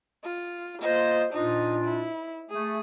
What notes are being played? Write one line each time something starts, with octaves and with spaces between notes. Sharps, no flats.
F4
A#3 F4 C5 D#5
A#2 D4 D#4 F4
E4
A3 G#4